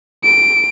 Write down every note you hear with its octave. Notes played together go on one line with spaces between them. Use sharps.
D7